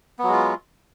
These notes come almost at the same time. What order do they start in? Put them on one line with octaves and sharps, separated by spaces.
B3 F#3 G#3 F4